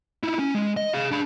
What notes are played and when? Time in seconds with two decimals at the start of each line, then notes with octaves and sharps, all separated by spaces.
0.23 D#4 E4
0.39 C#4
0.55 G#3
0.77 D#5
0.94 G#4 F5
1.11 D4 B5